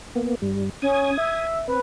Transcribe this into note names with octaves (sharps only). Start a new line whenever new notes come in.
A#3 B3
G2 G3
C#4 D#6 G#6
E5
C4 B4